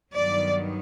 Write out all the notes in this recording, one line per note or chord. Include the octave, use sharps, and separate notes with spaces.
G2 D#3 F#3 B3 D5